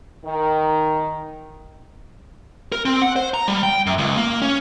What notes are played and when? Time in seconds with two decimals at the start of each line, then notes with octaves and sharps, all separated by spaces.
0.25 D#3
2.72 A#4
2.85 C4
3.02 F#5
3.16 C5
3.34 A#5
3.48 G3
3.63 G5
3.86 F#2
3.98 C#2
4.17 A#3
4.42 C#4